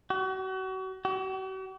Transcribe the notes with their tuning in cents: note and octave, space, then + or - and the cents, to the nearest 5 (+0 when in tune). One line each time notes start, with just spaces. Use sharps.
F#4 +35
F#4 +45